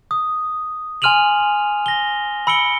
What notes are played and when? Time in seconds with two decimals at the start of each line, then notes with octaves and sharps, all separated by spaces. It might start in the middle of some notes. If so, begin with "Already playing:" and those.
0.11 D#6
1.02 G#5 C6 F6 D#7 F7 F#7
1.86 A#6 G7
2.47 B5 E6 C#7 D7 G7